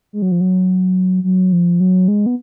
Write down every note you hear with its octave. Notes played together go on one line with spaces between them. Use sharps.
G#3
F#3
F3
F#3
F#3
F3
F#3
G#3
B3